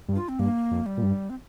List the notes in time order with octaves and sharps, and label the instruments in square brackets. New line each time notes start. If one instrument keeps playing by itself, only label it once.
[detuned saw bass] G2
[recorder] F4
C4
[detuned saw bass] G2 [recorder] A#3
[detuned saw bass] F2
[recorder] G3
[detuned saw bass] A#2
G2
[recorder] C4